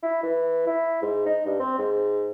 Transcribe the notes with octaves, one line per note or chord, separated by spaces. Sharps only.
E4
E3
E4
G#2
D#4
G2
C4
G#2